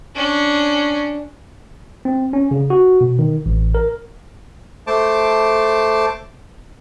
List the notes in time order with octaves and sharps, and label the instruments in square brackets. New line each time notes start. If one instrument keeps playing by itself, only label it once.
[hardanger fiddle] C#4 D4
[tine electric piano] C4
C#4
C#3
F#4
B2
D#3
A1
A#4
[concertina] A3 C5 A5 D6